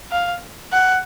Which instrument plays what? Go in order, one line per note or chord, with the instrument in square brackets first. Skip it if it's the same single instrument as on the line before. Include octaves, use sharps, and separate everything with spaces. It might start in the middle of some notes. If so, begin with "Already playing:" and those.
[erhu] F5
F#5